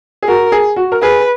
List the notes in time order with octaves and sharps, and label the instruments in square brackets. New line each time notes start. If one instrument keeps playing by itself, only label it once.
[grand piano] G#4
[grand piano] F#4 [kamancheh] A#4
[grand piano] G#4
F#4
A#4
[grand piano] G#4 [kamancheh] B4